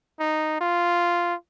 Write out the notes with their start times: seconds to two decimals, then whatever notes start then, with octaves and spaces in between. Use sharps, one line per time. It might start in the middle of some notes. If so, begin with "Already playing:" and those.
0.19 D#4
0.61 F4